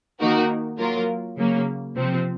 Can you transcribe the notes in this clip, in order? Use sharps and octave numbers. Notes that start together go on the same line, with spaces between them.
D#3 A#3 D#4 F#4 A#4
F#3 A#3 F4 A#4
C#3 F#3 A#3
C3 F3 C4